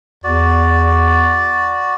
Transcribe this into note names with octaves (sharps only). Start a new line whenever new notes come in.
E2 F#4 D5